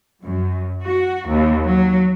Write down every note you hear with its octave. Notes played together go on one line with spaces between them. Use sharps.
F#2
F#4
D#2
F#3